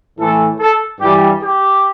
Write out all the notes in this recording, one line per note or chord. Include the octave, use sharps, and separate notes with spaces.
A2 E3 A3 A4
A4
G2 E3 G3 G4
G4